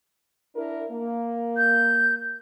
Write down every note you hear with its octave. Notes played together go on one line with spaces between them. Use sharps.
D4 E4 A#4
A#3
G6